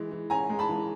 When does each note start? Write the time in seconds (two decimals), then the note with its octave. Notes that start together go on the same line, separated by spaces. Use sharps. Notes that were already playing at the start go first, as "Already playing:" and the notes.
Already playing: E3 G#3
0.11 E3
0.30 C#4 G#5 A#5
0.49 G#3
0.59 A5 B5
0.69 E3